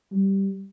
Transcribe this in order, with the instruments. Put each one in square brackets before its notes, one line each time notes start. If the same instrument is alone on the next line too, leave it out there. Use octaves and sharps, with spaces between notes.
[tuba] G3